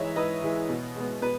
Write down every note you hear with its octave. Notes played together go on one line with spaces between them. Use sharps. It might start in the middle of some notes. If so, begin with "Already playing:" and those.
Already playing: G#2 E3 G#3 C#5 D#5 E5
G#2 B4 D#5
E3 G#3
B2
G#3 B3
B2 B4